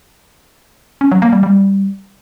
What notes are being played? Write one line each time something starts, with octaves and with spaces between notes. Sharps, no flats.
C#4
F#3
A#3
G3
G3